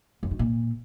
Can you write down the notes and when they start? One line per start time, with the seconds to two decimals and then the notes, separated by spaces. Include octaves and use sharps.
0.23 F#2
0.31 D#3
0.39 A#2